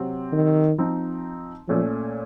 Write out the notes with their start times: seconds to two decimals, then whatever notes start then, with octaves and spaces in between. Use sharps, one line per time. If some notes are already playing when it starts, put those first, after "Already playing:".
Already playing: C3 F#3 C4
0.33 D#3
0.78 F3 C4 D#4
1.68 A#2 F3 A3 C#4